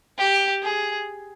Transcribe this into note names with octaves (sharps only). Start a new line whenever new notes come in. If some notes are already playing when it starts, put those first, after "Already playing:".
G4
G#4